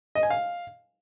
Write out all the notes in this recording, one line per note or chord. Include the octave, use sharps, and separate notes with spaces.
D#5
G#5
F5